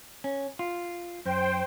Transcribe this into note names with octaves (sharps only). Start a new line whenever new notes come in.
C#4
F4
F#2 C5 G5